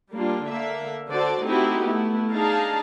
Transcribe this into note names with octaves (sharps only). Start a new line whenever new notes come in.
G3 A#3 D4 F4
D3 A#3 E5
D3 F#4 A4 C5 D5
A3 C4 D#4 E4 F#4 G4
A3 B3 E4
D4 D#4 G#4 F5 A5 A#5